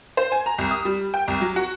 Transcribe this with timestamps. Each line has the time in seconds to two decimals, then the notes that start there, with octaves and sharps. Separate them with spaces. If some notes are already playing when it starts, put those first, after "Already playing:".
0.17 C5
0.32 G#5
0.46 A#5
0.58 C2
0.71 D#6
0.85 G3
1.14 G5
1.28 C2
1.41 F#3
1.56 F#4